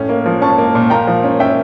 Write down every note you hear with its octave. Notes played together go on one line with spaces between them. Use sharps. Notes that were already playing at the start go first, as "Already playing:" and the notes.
Already playing: A2 C#4
A#3
F3
C#4 A5 C#6
A#3
A#2
A#2 G5 A#5
F3
C#4
C#4 E5 G5